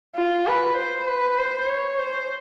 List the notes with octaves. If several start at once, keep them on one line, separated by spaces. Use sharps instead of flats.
F4
B4
C5
B4
C5
C#5
C5